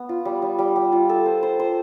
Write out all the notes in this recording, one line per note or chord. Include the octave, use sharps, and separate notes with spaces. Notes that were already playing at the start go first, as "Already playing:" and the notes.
Already playing: B3
F4
G3
G3
G3
G3
F4
A4
C5
C5
C5